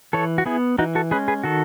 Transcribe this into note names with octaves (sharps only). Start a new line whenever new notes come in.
E3 A4 C#5
F#4
B3 E4 G#4
E3 D#4 F#4
F#4 A4
G#3 C#4 G#4 B4
G#4 B4
D#3 F#4 A4